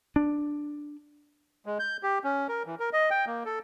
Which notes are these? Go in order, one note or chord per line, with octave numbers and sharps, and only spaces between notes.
D4
G#3
G6
G4
C#4
A#4
E3
A#4
D#5
G5
A#3
A4